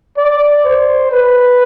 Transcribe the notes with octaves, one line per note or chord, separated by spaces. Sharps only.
D5
C5
B4